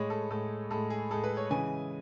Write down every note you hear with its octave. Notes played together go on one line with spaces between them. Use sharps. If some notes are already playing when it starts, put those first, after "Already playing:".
Already playing: A2 G#3 C#5
A4
A2 G#3 A4
A2 G#3 A4
G#4
A2 G#3 A4
B4
C#5
C#3 E3 G#3 G#5